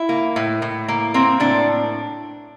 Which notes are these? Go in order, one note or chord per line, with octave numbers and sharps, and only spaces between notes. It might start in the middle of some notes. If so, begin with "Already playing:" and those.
Already playing: E4
A#3
A2
A2
A#3
A#3 C4
A2 D4